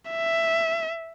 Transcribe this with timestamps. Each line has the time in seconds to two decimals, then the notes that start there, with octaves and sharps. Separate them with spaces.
0.10 E5